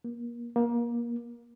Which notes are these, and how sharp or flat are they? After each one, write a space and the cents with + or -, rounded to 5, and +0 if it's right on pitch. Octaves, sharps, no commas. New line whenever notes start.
A#3 +30
A#3 +25